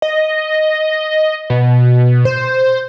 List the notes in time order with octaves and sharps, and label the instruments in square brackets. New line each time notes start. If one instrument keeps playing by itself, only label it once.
[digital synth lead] D#5
B2
C5